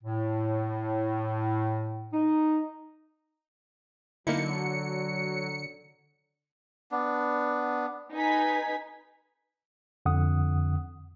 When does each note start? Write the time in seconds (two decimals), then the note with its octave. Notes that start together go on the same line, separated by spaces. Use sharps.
0.03 A2
2.13 D#4
4.27 D3 F#3 A#3 D#4 E4 C#7
6.92 B3 D4
8.14 D#4 B4 G#5 G#6 B6
10.06 F2 D3 F#5 D#6